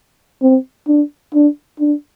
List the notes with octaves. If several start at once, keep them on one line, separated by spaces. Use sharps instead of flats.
C4
D4
D4
D4